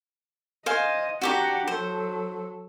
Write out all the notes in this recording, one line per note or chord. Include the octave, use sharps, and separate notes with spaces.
C5 D#5 F5 G#5
D4 F#4 G4 F#5 A#5
F#3 A4 C5